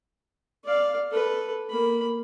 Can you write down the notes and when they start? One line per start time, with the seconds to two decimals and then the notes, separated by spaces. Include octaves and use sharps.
0.64 D5 F5
1.11 A4 B4
1.70 A#3 B5